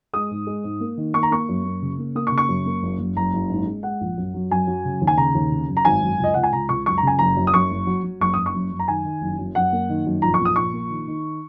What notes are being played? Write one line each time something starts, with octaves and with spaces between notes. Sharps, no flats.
G#3 D#6
G#2
G#3
G#2
A#3
D#3
A#3 C#6
A#5
A#3 C#6
F#2
A#3
C#3
A#3
A#3 D#6
C#6
C#3
C#6
F#2
A#3
F#1
F#1
F#1 A#5
F#1
G#2
G#3
G#3 F#5
A#1
F#2
F#3
F#2 G#5
F#3
C#3
D#2
G#5
C#3 A#5
D#2
C#3
F#2
A#5
G#1 G#5
F#2
C#2 D#5
C#2 F#5
G#5
C#2 A#5
C#2 C#6
F#2 C#6
A#5
C#3 G#5
F#1 A#5
F#2
D#6
F#2 C#6
F#1
F#3
F#3
F#1 C#6
F#1 D#6
C#6
F#2
F#2
A#5
D#3 G#5
D#3
F#1
F#2
F#2 F#5
A#3
D#3
F#2
A#1 A#5
C#6
A#2
D#6
A#1 C#6
A#3
D#3
D#3